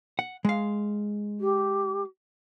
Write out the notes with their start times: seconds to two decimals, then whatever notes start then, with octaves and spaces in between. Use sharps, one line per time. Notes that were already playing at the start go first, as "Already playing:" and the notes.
0.19 F#5
0.45 G#3 F5
1.40 G4